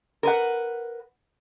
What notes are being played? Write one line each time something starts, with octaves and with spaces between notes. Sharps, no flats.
A#4 B4 F#5